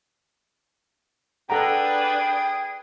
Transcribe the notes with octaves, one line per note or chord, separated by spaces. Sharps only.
D4 G#4 A4 B4 F#5 G5 A#5